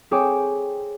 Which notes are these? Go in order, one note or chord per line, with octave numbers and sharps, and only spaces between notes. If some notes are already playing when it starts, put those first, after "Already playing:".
C4 G#4 C#5 G5 D6